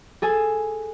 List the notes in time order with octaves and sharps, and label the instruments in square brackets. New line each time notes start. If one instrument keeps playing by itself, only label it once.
[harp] G#4 A4 G#5